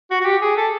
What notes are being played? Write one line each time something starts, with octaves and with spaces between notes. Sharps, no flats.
F#4
F#4
G4
G#4
A4